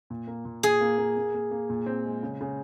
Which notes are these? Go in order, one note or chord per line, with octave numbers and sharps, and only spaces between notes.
A#2
A#3
A#2
A#2 G#4
A#3
A#3
A#3
A#3
A#3
A#2
C4
G#3
C#3
C#3